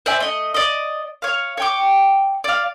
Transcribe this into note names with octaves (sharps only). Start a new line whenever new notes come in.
C5 D5 E5 G#5
A3 D#5
D5 D#5
C#5 F5
C#5 G5 D6
D5 F5